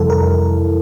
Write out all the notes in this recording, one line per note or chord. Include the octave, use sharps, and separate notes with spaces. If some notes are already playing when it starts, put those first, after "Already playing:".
Already playing: F2 C3 E3 G3 E4 A4
A#4